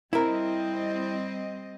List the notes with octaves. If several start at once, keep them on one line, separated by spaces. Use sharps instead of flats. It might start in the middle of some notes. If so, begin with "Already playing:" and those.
G3 C4 E4 A#4 D#5